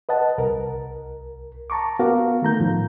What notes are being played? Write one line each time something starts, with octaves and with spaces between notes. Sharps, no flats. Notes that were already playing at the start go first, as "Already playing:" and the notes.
B4 D#5 F#5 A5
C2 A#4
A5 A#5 C#6 D6
B3 F#4 A#4 F5
D#3 A3 A#5 G6
A2 D#3 F3